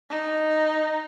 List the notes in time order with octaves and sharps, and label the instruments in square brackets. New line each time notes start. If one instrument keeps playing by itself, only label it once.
[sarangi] D#4